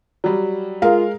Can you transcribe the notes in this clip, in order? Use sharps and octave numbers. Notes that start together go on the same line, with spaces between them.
F#3 G3
G#3 F4 A#4 F5